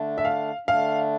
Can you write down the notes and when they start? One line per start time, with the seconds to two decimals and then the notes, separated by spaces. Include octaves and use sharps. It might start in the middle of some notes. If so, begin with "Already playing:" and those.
Already playing: D3 A3 D4
0.18 E5
0.25 F5
0.68 D3 A3 D4 F5